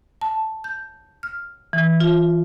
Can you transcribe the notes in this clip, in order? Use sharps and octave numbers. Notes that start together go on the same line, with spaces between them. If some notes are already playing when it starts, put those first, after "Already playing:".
A5
G6
F6
E3
F4